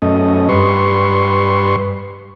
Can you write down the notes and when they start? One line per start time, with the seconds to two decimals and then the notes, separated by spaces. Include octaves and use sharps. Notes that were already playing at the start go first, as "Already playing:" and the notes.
0.02 F#2 A3 C#4 D#5
0.49 G2 B4 C6 C#6